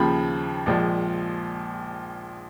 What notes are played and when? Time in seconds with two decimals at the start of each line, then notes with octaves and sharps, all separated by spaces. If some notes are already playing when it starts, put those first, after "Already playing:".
Already playing: D#2 C#3 F3 B5
0.66 A#1 A#2 F3 G#3